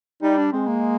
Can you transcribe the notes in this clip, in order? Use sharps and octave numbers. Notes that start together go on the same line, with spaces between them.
G3 D#4
D4
G#3 C4
A#3